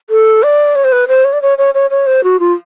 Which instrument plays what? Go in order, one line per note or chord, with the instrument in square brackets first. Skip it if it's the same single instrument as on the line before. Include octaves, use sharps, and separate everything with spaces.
[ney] A4
D5
C#5
C5
B4
C5
C#5
D5
C#5
C#5
C#5
C#5
C5
F#4
F4